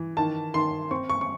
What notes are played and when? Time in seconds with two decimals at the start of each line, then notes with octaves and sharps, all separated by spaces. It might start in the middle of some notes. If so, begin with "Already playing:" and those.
Already playing: E3
0.17 D#3 A5
0.54 D#3 C6
0.91 C4 C#6
1.09 C#6
1.21 C#6